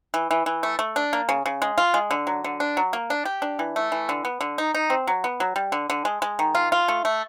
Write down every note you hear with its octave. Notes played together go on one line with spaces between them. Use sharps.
E3
E3
E3
A3
A3
D4
A#3
C#3
C#3
G#3
F4
G#3
D3
F#3
D3
D4
F#3
A#3
D4
G4
D4
E3
A3
E3
D3
B3
D3
D#4
D#4
C4
F#3
B3
F#3
G3
D3
D3
G#3
G#3
D#3
F4
F4
A3
A3